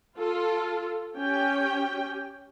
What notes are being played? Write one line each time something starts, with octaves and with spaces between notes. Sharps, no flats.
F4 A4
C#4 G4 G5